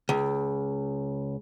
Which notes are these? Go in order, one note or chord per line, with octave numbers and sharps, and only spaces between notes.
C#2